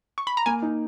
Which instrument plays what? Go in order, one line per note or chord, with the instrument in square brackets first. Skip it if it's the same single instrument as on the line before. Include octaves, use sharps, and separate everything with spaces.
[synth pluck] C#6
B5
A#5
[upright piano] A#3 [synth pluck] G#5
[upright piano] D#4